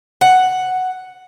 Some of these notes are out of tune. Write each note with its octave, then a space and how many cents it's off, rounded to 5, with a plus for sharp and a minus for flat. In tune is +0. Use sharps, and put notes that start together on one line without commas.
F#5 +0